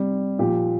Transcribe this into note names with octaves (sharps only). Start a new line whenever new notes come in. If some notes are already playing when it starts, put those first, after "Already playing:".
Already playing: C3 G3
A#2 F3 G4